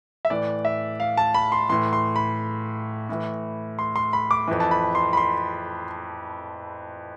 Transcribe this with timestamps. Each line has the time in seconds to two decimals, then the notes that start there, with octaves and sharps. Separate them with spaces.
0.25 E5
0.30 A2 E3 D5
0.65 E5
1.00 F5
1.17 A5
1.34 B5
1.52 C6
1.69 A2 E3 C6
1.93 C6
2.16 B5
3.09 A2 E3
3.79 C6
3.96 C6
4.13 B5
4.31 D6
4.48 F2 E3
4.60 A5
4.71 B5
4.95 C6
5.13 B5
5.17 C6